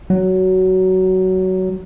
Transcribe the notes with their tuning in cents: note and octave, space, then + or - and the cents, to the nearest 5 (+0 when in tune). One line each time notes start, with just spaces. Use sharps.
F#3 +15